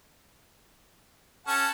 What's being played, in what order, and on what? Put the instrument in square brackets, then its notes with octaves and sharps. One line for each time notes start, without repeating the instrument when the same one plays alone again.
[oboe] C#4 [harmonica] A4 F#5 A5